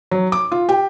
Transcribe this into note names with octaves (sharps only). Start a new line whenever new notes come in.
F#3
D6
F4
G4